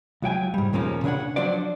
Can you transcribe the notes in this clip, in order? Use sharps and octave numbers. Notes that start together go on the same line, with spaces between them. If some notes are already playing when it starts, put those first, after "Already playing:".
C#2 F#3 G5 G#5
G#2 G3
D#2 A#2 C#3 F3 A#3 C#4
C#3 D4 C5 C#5 F#5
F3 F#3 D4 F#4 C5 D5